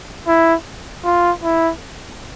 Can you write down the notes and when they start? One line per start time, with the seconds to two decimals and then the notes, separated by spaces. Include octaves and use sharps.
0.28 E4
1.05 F4
1.43 E4